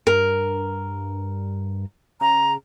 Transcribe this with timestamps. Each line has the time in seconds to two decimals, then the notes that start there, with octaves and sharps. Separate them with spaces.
0.07 G2 A#4
2.21 C#3 A#5